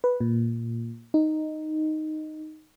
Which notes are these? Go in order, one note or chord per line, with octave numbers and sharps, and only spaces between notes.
B4
A#2
D#4